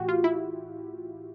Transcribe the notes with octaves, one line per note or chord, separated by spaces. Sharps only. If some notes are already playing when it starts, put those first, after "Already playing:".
Already playing: A2 E3 F#4 G4
F4
E4